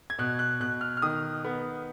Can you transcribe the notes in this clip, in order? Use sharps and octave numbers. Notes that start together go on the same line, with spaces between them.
G#6
B2 F#6
F#6
B2 F#6
F6
F6
D#3 D#6
B3